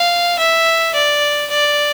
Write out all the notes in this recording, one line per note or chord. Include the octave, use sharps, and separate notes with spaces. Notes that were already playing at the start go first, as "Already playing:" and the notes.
Already playing: F5
E5
D5
D5